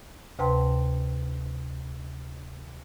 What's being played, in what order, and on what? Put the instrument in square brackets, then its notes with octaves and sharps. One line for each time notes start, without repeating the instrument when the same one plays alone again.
[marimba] D2 C3 B4 G5 A5 C6